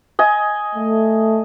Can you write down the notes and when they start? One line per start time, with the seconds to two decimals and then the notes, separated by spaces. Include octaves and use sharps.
0.19 D#5 G#5
0.76 A3